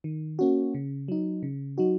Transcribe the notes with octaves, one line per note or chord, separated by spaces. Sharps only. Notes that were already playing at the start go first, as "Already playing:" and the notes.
D#3
A#3 C#4 F#4
C#3
F#3 D#4
C#3
F#3 D#4 F#4